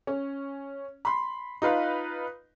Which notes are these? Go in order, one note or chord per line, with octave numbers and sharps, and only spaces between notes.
C#4
B5 C6
D#4 F4 B4 F5